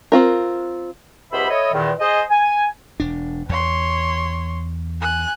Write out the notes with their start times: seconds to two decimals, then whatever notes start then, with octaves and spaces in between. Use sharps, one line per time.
0.12 C4 F4 A#4
1.32 C#2 B3 G4 C5 E5 B5
1.49 E4 A4 C#5 D#5
1.73 E2 A#2 D#3
2.00 G#4 C5 D#5
2.30 G#5
3.00 E1 D4
3.49 E2 C#5 C6
5.01 G#5 F#6